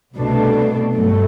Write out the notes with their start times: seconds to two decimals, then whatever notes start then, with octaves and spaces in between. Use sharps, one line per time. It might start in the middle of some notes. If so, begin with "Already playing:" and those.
0.17 C2 B2 A3 D4
0.93 G2 F#3 A3